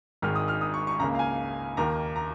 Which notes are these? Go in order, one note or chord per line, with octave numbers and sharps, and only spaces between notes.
G#1 G#2 D#3 G#3 F6
D#6
F6
D#6
C#6
C#6
C#2 C#3 A#3 A#5
F5
G#5
D#2 D#3 A#3 A#5
A#5